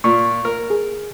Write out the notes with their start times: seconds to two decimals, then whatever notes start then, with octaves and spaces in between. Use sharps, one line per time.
0.04 A#2 C#6
0.45 A#4
0.70 G#4